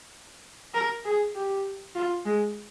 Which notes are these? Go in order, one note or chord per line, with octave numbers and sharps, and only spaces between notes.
A#4
G#4
G4
F4
G#3